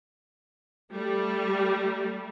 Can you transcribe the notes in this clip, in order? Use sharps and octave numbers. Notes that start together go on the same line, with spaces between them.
G3 A3